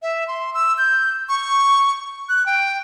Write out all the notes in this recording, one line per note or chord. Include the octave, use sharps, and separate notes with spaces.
E5
C6
E6
G6
C#6
F#6
G5